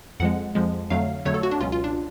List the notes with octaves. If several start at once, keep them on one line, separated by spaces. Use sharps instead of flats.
F2 F3 G#3 F#5
F2 F3 G#3
F2 D3 F#3 A3 F5
F2 D3 F#3 A3 C#5
A4
F#4
D4
C#2 B2 F#3 C#4 F4
F4
D4